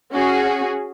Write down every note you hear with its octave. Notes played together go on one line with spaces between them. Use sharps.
C#4 F#4 G#4